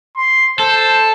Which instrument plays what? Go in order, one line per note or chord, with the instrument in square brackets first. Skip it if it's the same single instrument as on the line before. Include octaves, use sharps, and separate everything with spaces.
[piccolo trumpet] C6
[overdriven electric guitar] A4 [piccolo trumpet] C5